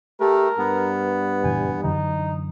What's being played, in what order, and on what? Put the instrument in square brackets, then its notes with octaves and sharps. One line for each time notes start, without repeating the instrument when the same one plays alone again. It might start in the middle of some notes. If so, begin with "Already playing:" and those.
[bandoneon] A3 [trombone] G4 [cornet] A#4
[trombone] G2 [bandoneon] B3
[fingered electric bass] F#1 A#2 E3 [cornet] G#5
[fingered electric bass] F#2 D3 E3 [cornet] D#4